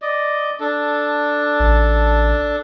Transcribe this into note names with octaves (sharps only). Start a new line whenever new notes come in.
D5 D#5
D4 A4
A1